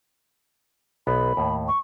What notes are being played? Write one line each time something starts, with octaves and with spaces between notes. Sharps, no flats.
B1 B3 B5
D#2 A2
C#6